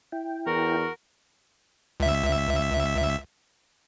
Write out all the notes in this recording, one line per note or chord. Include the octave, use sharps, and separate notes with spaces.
E4 G5
E2 F#4 A#4
C#2 E5